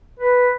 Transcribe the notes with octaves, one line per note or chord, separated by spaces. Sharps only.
B4